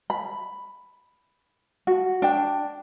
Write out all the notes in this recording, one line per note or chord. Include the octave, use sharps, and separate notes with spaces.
B5
F#4
D4 G5